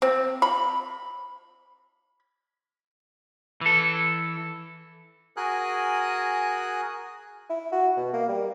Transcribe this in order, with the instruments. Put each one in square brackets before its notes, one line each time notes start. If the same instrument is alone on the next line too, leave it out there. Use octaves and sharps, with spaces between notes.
[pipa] C4
B5
[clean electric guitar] E3 A4
[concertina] F#4 G#4 A#4 G#5 D#6 F#6
[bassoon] E4
F#4
B2
A#3
G3